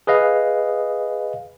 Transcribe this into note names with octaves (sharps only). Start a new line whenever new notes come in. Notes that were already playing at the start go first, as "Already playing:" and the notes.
G#4 B4 D#5 F5